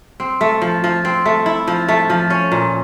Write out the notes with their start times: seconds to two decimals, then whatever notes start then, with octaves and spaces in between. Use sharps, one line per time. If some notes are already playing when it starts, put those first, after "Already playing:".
0.20 C4
0.41 A3
0.62 F3
0.84 F3
1.05 C4
1.26 A3
1.46 E4
1.67 F3
1.88 A3
2.10 F3
2.30 C#4
2.52 A#2